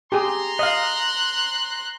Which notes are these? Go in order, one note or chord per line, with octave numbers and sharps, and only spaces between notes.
G4 G#4 A#5 C6
D#5 F5 F#6